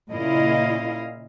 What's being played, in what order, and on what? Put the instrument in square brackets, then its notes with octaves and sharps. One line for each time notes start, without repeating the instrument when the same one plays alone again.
[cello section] A#2 C#3 E4 D#5 F5